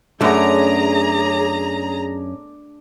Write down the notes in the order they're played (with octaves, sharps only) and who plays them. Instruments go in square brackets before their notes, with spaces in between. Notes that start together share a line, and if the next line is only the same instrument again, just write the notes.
[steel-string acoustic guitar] F#2 C#4 [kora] A3 B3 [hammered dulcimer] D4 D5 [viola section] G#4 A#5